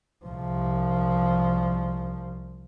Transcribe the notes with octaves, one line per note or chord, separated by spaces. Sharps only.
C2 F3